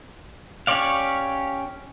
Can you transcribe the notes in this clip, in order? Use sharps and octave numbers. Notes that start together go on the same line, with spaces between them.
C#4 G4 C#5 D5 F5